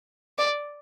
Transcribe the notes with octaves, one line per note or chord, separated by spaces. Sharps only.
D5